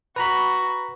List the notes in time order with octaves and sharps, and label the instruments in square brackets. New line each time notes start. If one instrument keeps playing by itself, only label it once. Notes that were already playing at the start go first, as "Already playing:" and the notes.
[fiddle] F#4 [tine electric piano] B4 A#5 B5